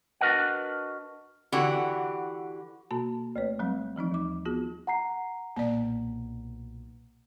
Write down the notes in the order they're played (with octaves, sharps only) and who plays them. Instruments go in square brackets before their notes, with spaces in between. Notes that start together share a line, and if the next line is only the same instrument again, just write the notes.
[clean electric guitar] D4 F#4 A#4 B4 D#5 F#5
[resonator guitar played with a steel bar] D3 E3 F#4 G4
[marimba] B2 A#3 F#4 A5 A#5
D2 A3 B4 C#5
F#3 G3 C4
E3 F3 C4 D#4
D#2 D6
B3 F4 F#4 G#4
[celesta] F#5 A#5 C7
[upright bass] B1 A#2 [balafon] A#3 D5